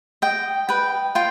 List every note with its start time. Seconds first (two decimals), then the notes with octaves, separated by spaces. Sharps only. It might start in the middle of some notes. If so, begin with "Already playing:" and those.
0.22 D#5 G5
0.69 B4 G5
1.15 F4 G5